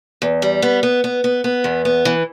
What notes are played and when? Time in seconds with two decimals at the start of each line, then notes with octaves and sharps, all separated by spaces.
0.22 E2
0.42 G3
0.62 B3
0.83 B3
1.04 B3
1.24 B3
1.44 B3
1.64 E2
1.85 B3
2.05 E3